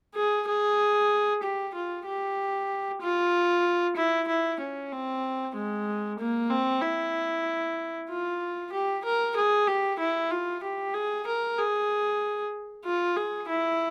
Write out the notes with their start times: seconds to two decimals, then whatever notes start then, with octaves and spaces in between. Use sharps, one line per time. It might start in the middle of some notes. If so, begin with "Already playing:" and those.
0.15 G#4
0.47 G#4
1.43 G4
1.74 F4
2.06 G4
3.01 F4
3.96 E4
4.28 E4
4.60 C#4
4.92 C4
5.55 G#3
6.19 A#3
6.50 C4
6.82 E4
8.09 F4
8.72 G4
9.04 A#4
9.36 G#4
9.67 G4
9.99 E4
10.31 F4
10.63 G4
10.94 G#4
11.27 A#4
11.58 G#4
12.85 F4
13.16 G#4
13.48 E4